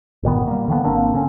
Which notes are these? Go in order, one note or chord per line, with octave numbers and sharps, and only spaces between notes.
G1 A#2 D#3 B3
G3 A#3
D3 D#3 F3 B3
G#1 A#3 C4 D4
D3 C4 C#4